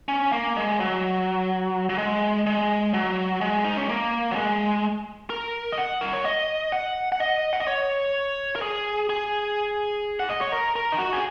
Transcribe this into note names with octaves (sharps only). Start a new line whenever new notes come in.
C#4
A#3
G#3
F#3
F#3
G#3
G#3
F#3
G#3
D#4
C#4
A#3
F#3
G#3
A#4
D#5
F#5
A#4
C#5
D#5
F#5
F#5
D#5
F#5
D#5
C#5
A#4
G#4
G#4
F#5
D#5
C#5
A#4
A#4
D#4
F#4
G#4